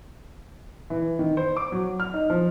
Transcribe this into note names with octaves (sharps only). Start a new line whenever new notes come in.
E3
D#3
C5
D6
F#3
F6
D#4
F3